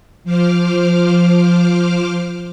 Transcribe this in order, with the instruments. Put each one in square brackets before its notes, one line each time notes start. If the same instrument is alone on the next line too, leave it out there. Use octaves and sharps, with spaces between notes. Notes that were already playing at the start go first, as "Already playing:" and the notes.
[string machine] F3 C5 D6 F6